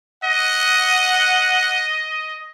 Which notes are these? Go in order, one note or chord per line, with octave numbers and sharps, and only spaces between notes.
D#5 F#5